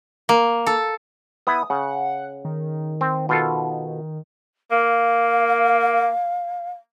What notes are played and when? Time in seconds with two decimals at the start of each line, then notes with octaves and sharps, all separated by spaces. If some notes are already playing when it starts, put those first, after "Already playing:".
0.29 A#3
0.67 A4
1.47 B3 E4 D#6
1.70 C#3 F#5
2.45 D#3
3.01 C4
3.29 B2 F4 A4
4.71 A#3 F5